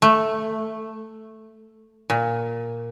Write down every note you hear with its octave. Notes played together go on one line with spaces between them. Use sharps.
A3
A#2